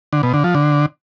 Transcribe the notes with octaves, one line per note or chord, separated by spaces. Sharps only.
D3
B2
D3
F3
D3